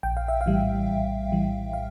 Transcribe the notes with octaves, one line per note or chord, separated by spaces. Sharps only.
A#1 G5
F5
E5
F5
A2 E3 G3
A#1
A2 E3 G3
F5